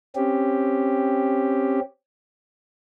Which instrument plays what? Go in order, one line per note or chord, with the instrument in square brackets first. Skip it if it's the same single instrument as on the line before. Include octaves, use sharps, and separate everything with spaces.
[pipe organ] C4 C#4 G4